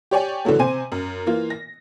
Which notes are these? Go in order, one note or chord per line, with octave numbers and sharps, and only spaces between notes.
G4 C#5 D5 G#5
D3 E3 F#3 A3
C3 C5 G#5 D#7
F#2
E3 A#3 F4
A#6